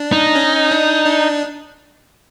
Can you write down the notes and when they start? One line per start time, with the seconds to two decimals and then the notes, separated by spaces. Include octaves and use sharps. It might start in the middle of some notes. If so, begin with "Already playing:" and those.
Already playing: D4
0.12 D#4
0.36 C#4
0.71 D4
1.06 D4